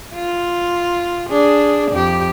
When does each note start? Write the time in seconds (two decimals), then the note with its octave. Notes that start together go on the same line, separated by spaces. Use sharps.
0.14 F4
1.29 D4 G#4
1.91 F2 G4